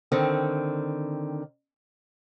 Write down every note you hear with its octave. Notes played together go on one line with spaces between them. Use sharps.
D3 D#3 C4